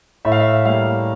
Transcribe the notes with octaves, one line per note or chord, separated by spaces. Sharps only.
A2 E5
F5
E5
G3 A#3 F5